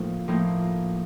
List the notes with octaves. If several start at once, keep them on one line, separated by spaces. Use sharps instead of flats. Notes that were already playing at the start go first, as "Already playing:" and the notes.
Already playing: A2 F3 A#3 D#4
A2 F3 A#3 D#4